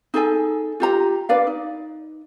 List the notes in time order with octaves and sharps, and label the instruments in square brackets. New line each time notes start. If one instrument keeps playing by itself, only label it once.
[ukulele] D#4 G#4 A4 G#5
F4 G4 A#5
D4 B4 D5 F5
D#4